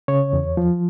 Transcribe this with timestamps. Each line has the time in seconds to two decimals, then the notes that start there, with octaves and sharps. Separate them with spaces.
0.08 C#3 C#5
0.33 E2
0.57 F3